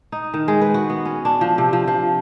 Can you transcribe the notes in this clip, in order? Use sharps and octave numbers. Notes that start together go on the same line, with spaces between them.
D#4
D#3
G#3
B4
F#4
B3
C#4
D4
F3
C3
F3
F3